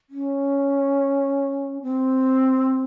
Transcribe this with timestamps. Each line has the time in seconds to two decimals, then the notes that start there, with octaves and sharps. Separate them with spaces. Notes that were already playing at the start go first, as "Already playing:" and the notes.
0.10 C#4
1.82 C4